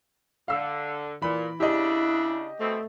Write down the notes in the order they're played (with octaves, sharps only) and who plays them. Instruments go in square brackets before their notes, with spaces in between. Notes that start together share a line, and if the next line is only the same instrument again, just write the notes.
[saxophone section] D3 [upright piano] F5 E6
[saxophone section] A#2 [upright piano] E3 B5
[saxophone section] C#3 D4 [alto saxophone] E4 [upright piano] G4 D#5
[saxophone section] B2 B3 C4 [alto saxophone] A3